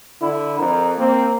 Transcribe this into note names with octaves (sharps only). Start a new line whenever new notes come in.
D3 E4
F2 A#4
A#3 C4